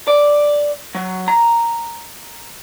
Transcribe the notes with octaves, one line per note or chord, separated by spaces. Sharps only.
D5
F#3
A#5